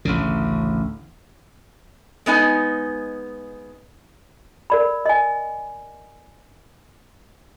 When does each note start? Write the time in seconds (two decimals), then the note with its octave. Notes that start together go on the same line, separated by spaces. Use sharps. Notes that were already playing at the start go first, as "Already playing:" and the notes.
0.05 A1 D2 C#3
2.26 G#3 B3 D#4 G#5
4.70 A#4 D5 B5
5.06 D#5 G#5